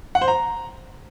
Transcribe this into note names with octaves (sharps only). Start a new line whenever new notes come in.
F#5
C5
A#5